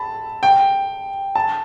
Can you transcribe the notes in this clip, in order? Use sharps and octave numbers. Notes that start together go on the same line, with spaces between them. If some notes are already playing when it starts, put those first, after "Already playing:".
Already playing: A5 B5
G5
A5